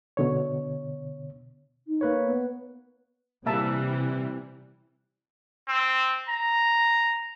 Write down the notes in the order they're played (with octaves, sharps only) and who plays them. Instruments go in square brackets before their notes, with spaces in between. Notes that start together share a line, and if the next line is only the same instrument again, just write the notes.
[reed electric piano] B2 D3 C#5
[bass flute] D#4
[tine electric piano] A#3 B4 C#5
[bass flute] B3
[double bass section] C3 [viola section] E3 G3 [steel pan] A#3 E5 A5
[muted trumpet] C4
A#5